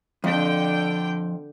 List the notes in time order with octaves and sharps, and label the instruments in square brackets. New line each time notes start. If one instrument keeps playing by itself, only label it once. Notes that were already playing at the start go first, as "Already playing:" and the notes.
[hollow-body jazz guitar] F2 [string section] D3 G5